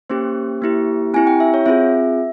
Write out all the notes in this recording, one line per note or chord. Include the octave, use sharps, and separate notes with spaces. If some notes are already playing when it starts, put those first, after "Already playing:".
A#3 C#4 G4 C5
A#3 E4 G4
C4 E4 G4 G#5
G5
E5
C#5
C4 F4 G#4 E5